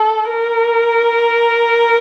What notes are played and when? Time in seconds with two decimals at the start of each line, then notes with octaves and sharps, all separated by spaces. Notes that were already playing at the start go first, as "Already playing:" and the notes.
Already playing: A4
0.30 A#4